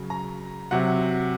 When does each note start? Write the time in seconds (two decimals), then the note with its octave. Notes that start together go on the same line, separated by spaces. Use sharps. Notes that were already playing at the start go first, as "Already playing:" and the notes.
Already playing: C#3 F#3
0.10 A#5
0.71 C3 F#3 F#5